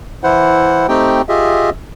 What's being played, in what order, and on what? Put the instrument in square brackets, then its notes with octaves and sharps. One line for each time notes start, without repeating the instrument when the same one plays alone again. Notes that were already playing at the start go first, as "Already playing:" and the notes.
[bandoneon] E3 E4 C5 F#5
A3 C4 D#4 G4 G5
F4 G4 G#4 D#5 E5